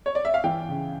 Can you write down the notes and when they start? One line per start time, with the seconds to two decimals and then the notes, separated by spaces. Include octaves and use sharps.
0.06 C#5
0.15 D5
0.25 E5
0.34 F5
0.44 E3 G5
0.69 C#3